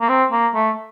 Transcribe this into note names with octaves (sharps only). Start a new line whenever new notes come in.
A#3
C4
A#3
A3